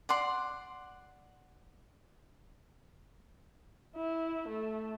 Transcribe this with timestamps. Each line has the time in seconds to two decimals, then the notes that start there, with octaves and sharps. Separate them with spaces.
0.09 D5 F#5 C6
3.96 E4
4.49 A3